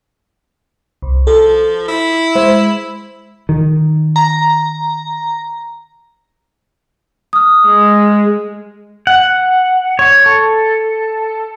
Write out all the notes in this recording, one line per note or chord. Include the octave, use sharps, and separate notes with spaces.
C2
F3 A4
E4
G#3 C5 E5
D#3
A#5
D#6 F6
G#3
F#5
C#5
A4